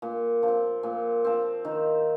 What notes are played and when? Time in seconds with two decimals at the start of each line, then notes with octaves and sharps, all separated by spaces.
0.02 A#2
0.43 F3
0.48 C4
0.83 A#2
1.24 F3 C4
1.65 D#3